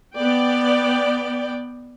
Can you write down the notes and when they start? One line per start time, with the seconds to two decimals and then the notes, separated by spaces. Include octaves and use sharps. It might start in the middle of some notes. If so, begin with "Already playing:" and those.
0.15 B3 D5 G5